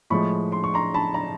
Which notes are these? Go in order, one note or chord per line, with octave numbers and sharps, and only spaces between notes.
A2 F3 G#3 B5 C#6
C6
C#6
A#5 C6
A5 B5
A#5